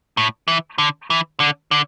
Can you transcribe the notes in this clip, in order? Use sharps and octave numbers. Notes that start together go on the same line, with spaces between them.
A2
E3
D3
E3
D3
D3